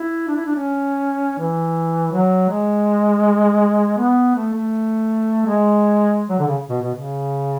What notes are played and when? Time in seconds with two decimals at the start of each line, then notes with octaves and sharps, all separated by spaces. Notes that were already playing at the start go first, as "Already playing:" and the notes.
Already playing: E4
0.28 D4
0.37 E4
0.46 D4
0.55 C#4
1.39 E3
2.12 F#3
2.49 G#3
3.98 B3
4.35 A3
4.53 A3
5.46 G#3
6.29 F#3
6.39 D3
6.48 C#3
6.70 B2
6.82 B2
6.94 C#3